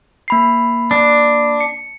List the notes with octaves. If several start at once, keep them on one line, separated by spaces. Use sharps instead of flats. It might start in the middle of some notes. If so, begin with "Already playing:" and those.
A#3 B5 C7
D4
C#7